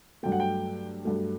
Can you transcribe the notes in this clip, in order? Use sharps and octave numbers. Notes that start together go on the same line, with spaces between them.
G2 F#3 A3 G5
F#5
G5
G2 F#3 A3